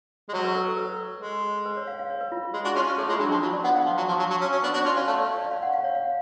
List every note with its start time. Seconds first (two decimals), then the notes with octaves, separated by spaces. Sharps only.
0.29 G#3
0.33 F#3 C#5
0.44 B4
0.55 A4
0.67 B4
0.77 B4
1.21 G#3
1.66 B4
1.77 C#5
1.87 F5
1.99 F5
2.10 C#5
2.21 B4
2.32 F4
2.43 F4
2.54 G#3
2.65 D4 F#4
2.75 C#4 F4
2.87 C#4
2.98 A3 G#4
3.09 G#3 F4
3.20 F#3 D4
3.31 F3 D4
3.42 F#3 F4
3.53 D5
3.64 B3 F#5
3.75 F5
3.86 F3
3.97 F#3
4.08 F3
4.19 F#3
4.30 F#3
4.41 C#4
4.52 C#4
4.63 B3 D4
4.74 D4 F#4 C#5
4.85 C#4 F4 D5
4.96 C#4 F5
5.07 A3 F5
5.18 D5
5.29 C#5
5.40 D5
5.51 F5
5.63 F#5
5.74 F5
5.84 C#5
5.95 F5